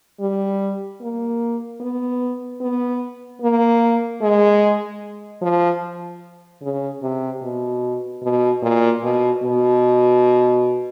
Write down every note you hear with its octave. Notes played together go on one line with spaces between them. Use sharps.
G3
A#3
B3
B3
A#3
G#3
F3
C#3
C3
B2
B2
A#2
B2
B2